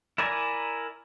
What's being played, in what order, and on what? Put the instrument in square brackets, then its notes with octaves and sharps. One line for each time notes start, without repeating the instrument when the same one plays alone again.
[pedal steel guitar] E4 A#4 D5 G#5 A#5